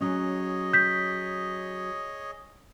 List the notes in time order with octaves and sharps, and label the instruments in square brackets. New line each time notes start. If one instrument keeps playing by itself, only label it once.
[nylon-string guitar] F#3 C#4 [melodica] G#4 C#5 D#5
[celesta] G6 B6